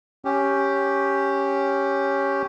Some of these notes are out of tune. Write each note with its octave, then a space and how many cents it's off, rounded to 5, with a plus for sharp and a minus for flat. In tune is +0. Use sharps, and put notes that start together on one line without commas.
C#4 +0 G4 +0